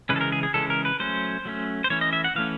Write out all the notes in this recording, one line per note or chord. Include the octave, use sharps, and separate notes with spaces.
C#3 E3 G#3 C#4 B4
A4
A#4
G#4
G#4
C#3 E3 G#3 C#4 A4
A#4
B4
F#3 A3 C#4 C5
F#3 A3 C#4
C5
E3 A3 C#4 C#5
D#5
E5
F#5
E3 A3 C#4 F5